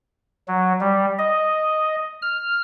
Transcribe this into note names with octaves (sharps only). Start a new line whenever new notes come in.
F#3
G3
D#5
F6